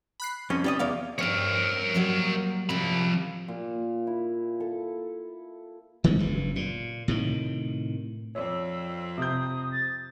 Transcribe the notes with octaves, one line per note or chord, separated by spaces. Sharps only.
B5 F#6 C7
F2 C4 C#4
G3 G4 D#5
E2 D5 F5
G2 C4 A#4 C#5
F#3 G3 A#3
C3 F3 G3 B5
A#2
E4
A4
D#3 G#3 B3
F#1 G2
A#2
A2 C3 D#3
F2 C4 C#5 D5 E6
C3 D#6 G6
A6